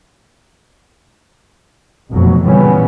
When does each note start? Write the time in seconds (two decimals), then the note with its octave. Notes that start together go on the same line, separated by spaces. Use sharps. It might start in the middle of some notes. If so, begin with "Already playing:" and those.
2.10 F1 F2 B2 F#3
2.43 A#2 C#3 E3 G3 B3 C#4